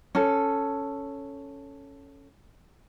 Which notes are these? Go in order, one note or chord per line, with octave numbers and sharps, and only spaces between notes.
C#4 A4